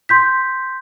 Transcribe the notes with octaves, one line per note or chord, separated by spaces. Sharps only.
C6 G6 B6